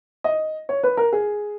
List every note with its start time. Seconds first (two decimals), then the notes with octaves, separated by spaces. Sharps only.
0.24 D#5
0.69 C#5
0.83 B4
0.97 A#4
1.13 G#4